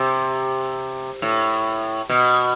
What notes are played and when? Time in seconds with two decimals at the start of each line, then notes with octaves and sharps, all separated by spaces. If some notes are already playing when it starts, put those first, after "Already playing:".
Already playing: C3
1.22 A2
2.09 B2